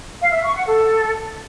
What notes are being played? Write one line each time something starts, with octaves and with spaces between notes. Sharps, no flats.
F5
E5
C#6
F#5
A4